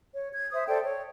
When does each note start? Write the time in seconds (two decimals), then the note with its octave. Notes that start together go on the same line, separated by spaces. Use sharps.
0.15 C#5
0.33 G#6
0.51 C5 E5 D#6
0.67 A4 C5 D5 G5
0.82 C#5